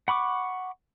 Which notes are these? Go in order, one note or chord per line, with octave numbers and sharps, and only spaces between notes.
F#5 B5 C#6 D6